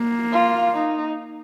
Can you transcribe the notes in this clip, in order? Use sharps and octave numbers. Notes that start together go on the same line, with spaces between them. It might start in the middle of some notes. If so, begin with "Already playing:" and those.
Already playing: A#3
F4
D#4